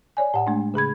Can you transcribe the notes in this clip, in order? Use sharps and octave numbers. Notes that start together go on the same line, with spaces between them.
C#5 D5 G#5
A2 F#5
G#3 A3 D4
C#3 G#4 B5 G#6